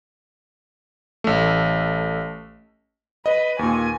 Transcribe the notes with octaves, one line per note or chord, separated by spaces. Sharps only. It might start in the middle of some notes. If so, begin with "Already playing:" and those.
A1 A3
B4 D#5
D#2 A#2 G#5